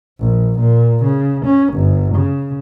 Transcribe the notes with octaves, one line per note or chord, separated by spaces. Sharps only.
A#1
A#2
C#3
C#4
G1
C#3